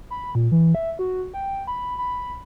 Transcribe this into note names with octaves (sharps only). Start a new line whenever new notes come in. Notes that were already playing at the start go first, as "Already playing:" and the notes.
B5
A#2
E3
E5
F#4
G5
B5
B5